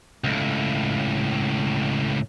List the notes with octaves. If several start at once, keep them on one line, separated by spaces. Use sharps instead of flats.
C#2 A2